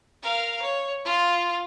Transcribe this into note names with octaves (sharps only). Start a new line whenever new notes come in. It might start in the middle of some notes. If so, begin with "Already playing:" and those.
A#4 F5
C#5
F4